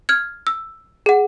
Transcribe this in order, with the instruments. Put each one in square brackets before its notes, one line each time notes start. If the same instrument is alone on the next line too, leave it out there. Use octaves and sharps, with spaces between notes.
[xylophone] F6 G#6
E6
G#4 F#5